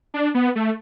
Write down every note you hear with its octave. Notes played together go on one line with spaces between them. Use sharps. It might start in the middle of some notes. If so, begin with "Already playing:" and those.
D4
B3
A3